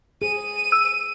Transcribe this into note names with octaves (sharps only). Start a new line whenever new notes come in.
G#4 D#7
E6